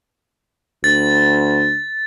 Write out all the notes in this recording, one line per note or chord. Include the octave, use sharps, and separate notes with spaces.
D2 A6